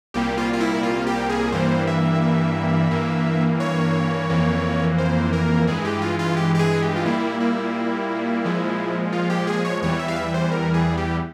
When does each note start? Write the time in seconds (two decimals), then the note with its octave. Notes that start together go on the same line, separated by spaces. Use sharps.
0.14 C2 A#2 G3 A#3 G4
0.38 F4
0.53 F4
0.60 E4
0.83 F4
1.07 G4
1.29 G#4
1.52 G2 E3 G3 A#3 C5
1.87 E5
2.91 G2 E3 A#3
3.60 C#5
4.29 F2 E3 A#3
4.98 C5
5.33 A#4
5.67 G2 E3 G#3 G#4
5.85 G4
6.02 F4
6.19 F4
6.37 G4
6.55 G4
6.59 G#4
6.82 G4
6.96 F4
7.06 A#2 G3 A#3 E4
7.40 E4
8.44 A#2 F3 G#3
9.12 F4
9.30 G4
9.47 G#4
9.65 C#5
9.82 E2 E3 G3 C#5
9.99 E5
10.08 F5
10.16 E5
10.34 C5
10.52 A#4
10.74 G#4
10.97 G4